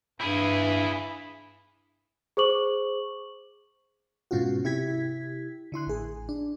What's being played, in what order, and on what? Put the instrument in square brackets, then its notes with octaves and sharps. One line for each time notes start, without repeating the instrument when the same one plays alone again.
[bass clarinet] G2 [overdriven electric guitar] E4 G#4
[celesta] G#4 C5 C#6 D6 F#7
[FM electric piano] G#2 B2 C#4 F4 F#4
C3 E4 G4 G#6 B6
D3 E4 C6 F#6
A1 G#4
D4